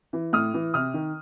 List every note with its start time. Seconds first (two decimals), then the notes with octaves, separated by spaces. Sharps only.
0.13 E3
0.33 A2 D#6 F6
0.54 E3
0.74 C3 D#6 F6
0.94 D#3